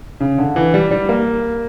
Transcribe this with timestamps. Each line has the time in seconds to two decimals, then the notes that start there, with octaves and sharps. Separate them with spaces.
0.20 C#3
0.38 D3
0.56 E3
0.74 G3
0.91 G3
1.09 A#3